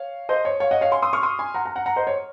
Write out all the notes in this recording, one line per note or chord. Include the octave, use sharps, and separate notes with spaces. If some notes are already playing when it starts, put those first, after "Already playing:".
Already playing: C#5 F5
C5 D#5
C#5
C#5 F5
D#5 F#5
C#5 F5
G#5 C6
C6 D#6
C#6 F6
C6 D#6
G#5 C6
F#5 A#5
F#5 A#5
F#5 A#5
F#5 A#5
C5 D#5
C#5